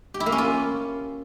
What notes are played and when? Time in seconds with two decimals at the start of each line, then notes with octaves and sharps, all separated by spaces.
0.14 G4
0.20 E4
0.26 A#3
0.32 C#4
0.38 F4